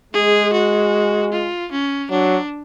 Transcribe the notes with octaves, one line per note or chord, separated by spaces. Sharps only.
G#3 G#4
F#4
F4
C#4
F#3 D4